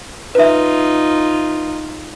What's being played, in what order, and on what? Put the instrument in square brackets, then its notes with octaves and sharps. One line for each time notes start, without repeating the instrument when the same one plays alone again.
[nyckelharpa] D#4 F4 [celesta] B4 E5